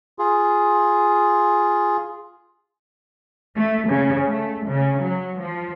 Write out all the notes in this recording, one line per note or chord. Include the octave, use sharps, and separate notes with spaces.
F4 G#4
A3
C#3
A3
C#3
F#3
F3